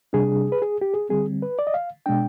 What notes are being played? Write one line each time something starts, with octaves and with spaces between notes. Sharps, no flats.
C3 G3 D4 G#4
B4
G#4
G4
G#4
D3 G3 C4 G#4
B4
D5
D#5
F5
B2 G#3 D4 G5